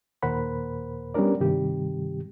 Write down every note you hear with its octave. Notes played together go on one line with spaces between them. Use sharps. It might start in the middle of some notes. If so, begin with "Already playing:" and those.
D#2 A#2 A#4 C5 F#5 B5
G3 B3 C#4 D4 A#4 D5
G2 C3 D#3 G3 G4